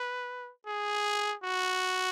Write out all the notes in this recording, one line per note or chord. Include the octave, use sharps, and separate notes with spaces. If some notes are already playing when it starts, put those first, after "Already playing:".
Already playing: B4
G#4
F#4